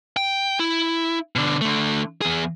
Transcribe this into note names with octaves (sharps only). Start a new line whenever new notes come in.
G5
E4
B2 D3
D3 A3
E2 G#4